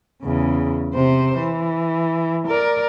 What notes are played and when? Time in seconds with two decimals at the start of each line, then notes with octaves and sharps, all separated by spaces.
0.22 E2 C#3
0.94 C3 C5
1.38 E3
2.48 A#4 D5